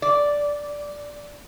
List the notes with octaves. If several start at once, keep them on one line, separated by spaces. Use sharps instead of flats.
D5